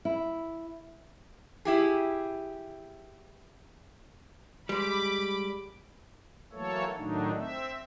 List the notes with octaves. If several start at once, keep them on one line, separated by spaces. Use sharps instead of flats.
E4
E4 G4 G#4
G3 G#3 B5 D6
E3 F#3 A3 A#3 A4 C#5
A2 D#3 F#3 A3 D4 D#4
C4 E5